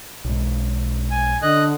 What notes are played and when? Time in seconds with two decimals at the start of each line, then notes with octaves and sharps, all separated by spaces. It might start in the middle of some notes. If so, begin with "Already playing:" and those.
0.25 B1 G#2
1.11 G#5
1.42 D3 D#5 F#6